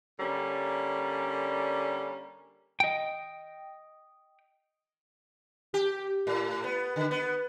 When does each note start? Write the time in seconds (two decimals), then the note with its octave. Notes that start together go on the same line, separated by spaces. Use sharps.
0.19 D3 G3 A#3 C#4
2.80 D#5 G5
5.74 G4
6.27 A2
6.64 B3
6.96 D3
7.11 B3